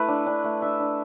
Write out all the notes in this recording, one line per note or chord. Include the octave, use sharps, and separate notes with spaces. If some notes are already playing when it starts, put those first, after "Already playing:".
Already playing: A3 E4 B4
D4
D4
A3
D4 E5
D4